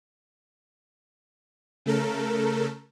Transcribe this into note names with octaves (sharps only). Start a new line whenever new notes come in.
C#3 A3 A4 A#4